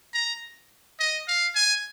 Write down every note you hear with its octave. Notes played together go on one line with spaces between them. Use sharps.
A#5
D#5
F5
G#5